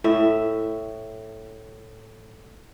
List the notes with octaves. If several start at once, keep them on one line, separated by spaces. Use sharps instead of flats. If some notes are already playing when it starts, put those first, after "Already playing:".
A2 E5